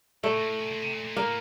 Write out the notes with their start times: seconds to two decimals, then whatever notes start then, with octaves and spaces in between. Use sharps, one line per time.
0.24 A#2 A3
0.36 A#2
0.47 A2
0.59 A#2
0.70 A#2
0.81 C3
0.93 A#2
1.04 A#2
1.17 A2 A#3